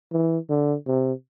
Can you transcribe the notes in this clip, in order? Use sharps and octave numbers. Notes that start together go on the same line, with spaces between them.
E3
D3
C3